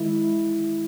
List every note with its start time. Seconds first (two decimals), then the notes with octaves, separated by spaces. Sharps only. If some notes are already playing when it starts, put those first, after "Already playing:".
Already playing: D#3 G#3 E4